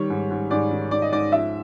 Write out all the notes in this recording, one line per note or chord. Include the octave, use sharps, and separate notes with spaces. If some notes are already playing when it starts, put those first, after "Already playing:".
Already playing: D#3 G3 C#5
G#2
G#2
G#2 D5
D#3
G#2 D5
D#5
G#2 D5
F3 E5